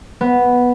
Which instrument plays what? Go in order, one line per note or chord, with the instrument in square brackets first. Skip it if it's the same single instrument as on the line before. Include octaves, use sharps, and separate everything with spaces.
[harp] B3